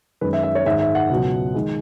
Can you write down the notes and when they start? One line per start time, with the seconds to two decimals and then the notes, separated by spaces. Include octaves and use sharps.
0.21 F#2 D#3 G#3 B4
0.33 E5
0.43 E5
0.55 C#5
0.65 G#2 D#3 G#3 E5
0.81 E5
0.95 F#5
1.10 C#2 B2 F#3
1.54 D#3 G#3